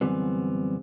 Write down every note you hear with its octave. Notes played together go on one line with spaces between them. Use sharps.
F#2 D3 E3 G3 B3 C4